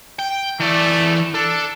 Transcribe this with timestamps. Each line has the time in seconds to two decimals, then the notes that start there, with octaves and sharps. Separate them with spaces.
0.19 G5
0.60 E3 A3 D5
1.35 D4 A4